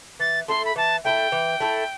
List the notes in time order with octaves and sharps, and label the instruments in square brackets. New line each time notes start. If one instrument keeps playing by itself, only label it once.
[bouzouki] E3 [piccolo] A6
[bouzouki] A3 E4 A4 [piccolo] C6
[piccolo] B5
[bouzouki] E3 [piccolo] A5
[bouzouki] A3 E4 A4 [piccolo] G5
[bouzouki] E3
A3 E4 A4